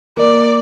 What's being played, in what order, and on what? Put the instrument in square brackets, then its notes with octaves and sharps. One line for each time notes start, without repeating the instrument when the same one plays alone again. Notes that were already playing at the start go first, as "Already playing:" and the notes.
[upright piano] A#3 [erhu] D5